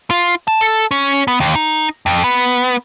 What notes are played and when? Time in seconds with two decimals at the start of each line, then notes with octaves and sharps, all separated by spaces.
0.11 F4
0.48 A5
0.61 A4
0.91 C#4
1.28 B3
1.40 D#2
1.55 D#4
2.06 F2
2.24 B3